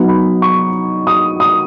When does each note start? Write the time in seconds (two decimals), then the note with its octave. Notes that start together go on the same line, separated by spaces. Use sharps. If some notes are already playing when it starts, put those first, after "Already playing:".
Already playing: F#3 B3 D#4
0.08 B5
0.42 C#6
1.07 D#6
1.40 D#6